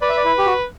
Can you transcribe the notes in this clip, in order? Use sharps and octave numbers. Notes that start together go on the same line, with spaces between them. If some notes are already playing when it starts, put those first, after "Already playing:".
B4 D5
E5
D5
E4
G4
F#4